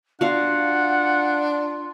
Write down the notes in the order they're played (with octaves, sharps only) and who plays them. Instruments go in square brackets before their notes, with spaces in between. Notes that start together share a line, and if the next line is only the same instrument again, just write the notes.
[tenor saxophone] D4 [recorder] F4 [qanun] F#4 F5 [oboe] F#5